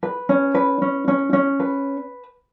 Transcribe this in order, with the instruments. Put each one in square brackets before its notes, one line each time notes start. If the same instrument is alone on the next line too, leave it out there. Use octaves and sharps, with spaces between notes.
[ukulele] B4
C#4
B4
C#4
C#4
C#4
B4